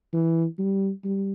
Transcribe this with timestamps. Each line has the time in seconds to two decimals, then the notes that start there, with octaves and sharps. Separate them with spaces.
0.13 E3
0.59 G3
1.04 G3